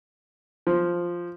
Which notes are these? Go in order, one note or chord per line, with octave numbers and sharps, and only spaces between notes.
F3